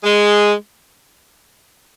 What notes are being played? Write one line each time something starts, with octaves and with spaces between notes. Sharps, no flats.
G#3